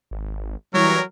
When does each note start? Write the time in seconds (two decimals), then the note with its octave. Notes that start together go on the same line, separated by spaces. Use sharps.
0.11 G#1
0.74 E3 F#3 G3 A#4 C#5